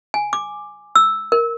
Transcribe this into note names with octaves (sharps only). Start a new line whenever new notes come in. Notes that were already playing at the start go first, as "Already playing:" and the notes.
G#5
D6
E6
A#4